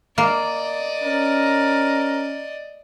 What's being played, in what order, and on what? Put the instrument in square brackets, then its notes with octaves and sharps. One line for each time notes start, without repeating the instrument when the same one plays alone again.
[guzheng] A#3 [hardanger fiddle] D5 D#5
[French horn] C#4 [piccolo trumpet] A#4